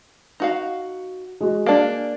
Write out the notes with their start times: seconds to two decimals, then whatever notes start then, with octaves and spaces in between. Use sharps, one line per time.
0.40 D#4 F#4 F5
1.41 G#3 F#4
1.66 A#3 D4